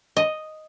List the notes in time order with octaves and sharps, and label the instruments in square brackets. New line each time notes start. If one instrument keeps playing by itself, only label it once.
[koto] D#5